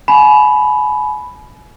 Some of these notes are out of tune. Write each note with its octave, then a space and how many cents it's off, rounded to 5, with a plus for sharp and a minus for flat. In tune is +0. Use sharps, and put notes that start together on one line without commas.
G#5 +35 B5 +0